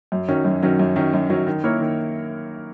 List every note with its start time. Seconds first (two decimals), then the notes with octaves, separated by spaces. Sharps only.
0.12 F#2
0.28 D#3 F#3 C#4
0.45 F#2
0.63 D#3 F#3 C#4
0.79 F#2
0.96 D#3 F#3 C#4
1.13 F#2
1.30 D#3 F#3 C#4
1.47 D#3
1.63 A#3 E4 A#4 C#5
1.80 D#3